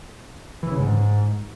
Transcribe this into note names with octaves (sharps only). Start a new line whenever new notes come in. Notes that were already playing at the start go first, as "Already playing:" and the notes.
E3
C#3
G#2